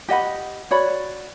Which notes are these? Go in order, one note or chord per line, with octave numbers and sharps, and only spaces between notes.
G4 D#5 F#5 B5
F#4 C#5 D5 B5